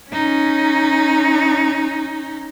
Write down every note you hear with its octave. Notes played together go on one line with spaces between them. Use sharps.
C#4 D#4